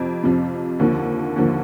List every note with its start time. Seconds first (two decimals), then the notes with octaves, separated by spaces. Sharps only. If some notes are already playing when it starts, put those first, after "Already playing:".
Already playing: F2 C3 F3
0.23 F2 C3 F3
0.79 D#2 D3 F3 A#3
1.36 D#2 D3 F3 A#3